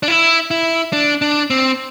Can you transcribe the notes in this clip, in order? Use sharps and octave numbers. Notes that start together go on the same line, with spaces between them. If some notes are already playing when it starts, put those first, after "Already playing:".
D4
E4
E4
D4
D4
C4